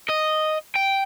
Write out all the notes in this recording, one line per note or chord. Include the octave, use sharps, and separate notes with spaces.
D#5
G5